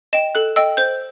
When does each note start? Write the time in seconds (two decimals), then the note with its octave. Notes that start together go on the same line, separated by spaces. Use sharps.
0.13 D#5 G5 E7
0.35 A4 F#6
0.56 D#5 G5 E6
0.77 C5 G6